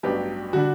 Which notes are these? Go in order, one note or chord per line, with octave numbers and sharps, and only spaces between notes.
A1 G2 F#3 B3 D4 G4
D3 G3 D4 F#4